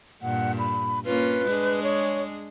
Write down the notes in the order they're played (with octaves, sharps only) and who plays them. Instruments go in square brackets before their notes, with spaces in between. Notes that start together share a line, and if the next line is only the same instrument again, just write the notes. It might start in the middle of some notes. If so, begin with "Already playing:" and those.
[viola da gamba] G2 A#2 [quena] F#5
[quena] B5
[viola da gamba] A#3 C#4 F4 [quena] B4
[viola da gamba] G#3 D4 G#4
[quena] C#5